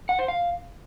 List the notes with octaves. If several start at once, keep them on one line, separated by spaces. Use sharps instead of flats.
F#5
C5
F5